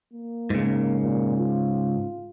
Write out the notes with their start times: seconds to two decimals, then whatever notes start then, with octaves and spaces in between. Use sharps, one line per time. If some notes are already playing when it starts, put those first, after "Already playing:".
0.13 A#3
0.50 G#2 C#3
0.99 A#2
1.37 F4